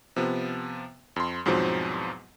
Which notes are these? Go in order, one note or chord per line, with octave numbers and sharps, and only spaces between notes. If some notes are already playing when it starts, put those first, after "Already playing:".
C3 F3 B3
F2 C6
E2 G#2 B2 F3 F#3 C4